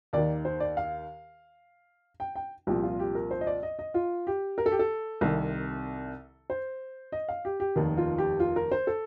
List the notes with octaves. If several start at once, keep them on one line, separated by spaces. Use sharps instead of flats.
D#2 D#3 D5
C5
D5
F5
G5
G5
C2 A#2 F3 G4
F4
G4
A#4
C5
D#5
D5
D#5
D#5
F4
G4
A#4
A4
G4
A4
C2 C3 D#3
C5
D#5
F5
G4
G4
F1 D#2 D#3
F4
G4
F4
A#4
C5
A4